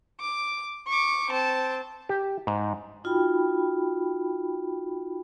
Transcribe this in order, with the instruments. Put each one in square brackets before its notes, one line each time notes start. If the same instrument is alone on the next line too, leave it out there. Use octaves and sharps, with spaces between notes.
[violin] D6
C#6 D6
C4 A5
[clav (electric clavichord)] G4
G#2
[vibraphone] D#4 F4 F#4 G5 B5